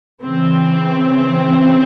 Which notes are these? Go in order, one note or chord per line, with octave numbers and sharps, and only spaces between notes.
C#3 E3 C4